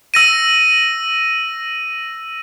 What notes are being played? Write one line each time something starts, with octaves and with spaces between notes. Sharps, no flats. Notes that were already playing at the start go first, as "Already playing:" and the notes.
E6 A#6 D#7